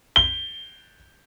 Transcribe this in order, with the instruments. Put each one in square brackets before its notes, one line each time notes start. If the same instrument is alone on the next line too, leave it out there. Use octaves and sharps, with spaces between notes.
[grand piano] G7